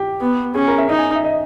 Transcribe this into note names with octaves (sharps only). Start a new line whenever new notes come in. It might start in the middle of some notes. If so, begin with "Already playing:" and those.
Already playing: G4
B3
C#4 G#4
A#4
E5
D#4 D#5
G#5
E5
D#5